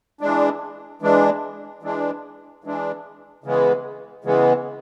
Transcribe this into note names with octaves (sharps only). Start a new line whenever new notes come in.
E3 G#3 D4
E3 G#3 D4
E3 G#3 D4
E3 G#3 D4
C#3 E3 G#3 B3
C#3 E3 G#3 B3